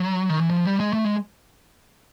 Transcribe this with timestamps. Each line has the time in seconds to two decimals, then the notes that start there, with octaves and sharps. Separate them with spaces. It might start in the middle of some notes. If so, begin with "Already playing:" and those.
Already playing: F#3
0.29 D#3
0.40 E3
0.50 F3
0.65 G3
0.80 G#3
0.93 A3
1.05 G#3